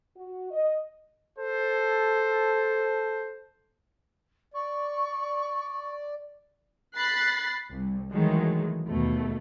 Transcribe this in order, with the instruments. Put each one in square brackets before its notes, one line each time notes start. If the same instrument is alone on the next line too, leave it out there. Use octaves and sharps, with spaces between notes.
[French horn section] F#4
D#5
[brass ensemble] A4 C5
[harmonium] D5 [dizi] C#6
[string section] B5 F#6 A6 C7
C2
D#3 E3 F#3 G#3 A3
D#2 B2 A3